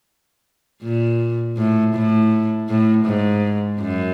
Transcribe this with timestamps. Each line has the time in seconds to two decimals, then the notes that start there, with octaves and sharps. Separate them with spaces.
0.82 A#2
1.57 A2
1.94 A2
2.68 A2
3.05 G#2
3.79 F#2